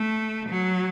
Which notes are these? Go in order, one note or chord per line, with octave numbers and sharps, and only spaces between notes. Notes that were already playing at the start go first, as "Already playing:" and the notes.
Already playing: A3
F#3